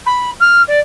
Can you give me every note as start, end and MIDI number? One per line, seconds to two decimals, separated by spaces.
0.06 0.30 83
0.40 0.61 89
0.67 0.79 74